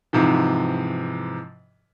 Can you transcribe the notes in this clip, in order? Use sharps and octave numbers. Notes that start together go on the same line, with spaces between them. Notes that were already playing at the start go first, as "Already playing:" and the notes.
G#2 C3 E3 F3